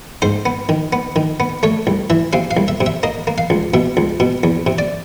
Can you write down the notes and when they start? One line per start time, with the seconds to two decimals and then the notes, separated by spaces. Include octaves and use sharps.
0.22 G#2 C5
0.46 B3
0.69 D#3
0.93 B3
1.16 D#3
1.40 B3
1.63 A3 C#5
1.87 C2
2.10 E3 E5
2.33 C3 F5
2.51 F5
2.57 C2
2.68 E5
2.81 C3
2.86 E5
3.03 A#3 D#5
3.27 A#3
3.38 F5
3.50 C#2
3.74 B2 E5
3.97 C#2
4.20 B2
4.44 E2
4.67 C3
4.78 D5